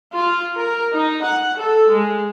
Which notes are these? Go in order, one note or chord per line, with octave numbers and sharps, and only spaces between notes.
F4
A#4
D#4
F#5
A4
G#3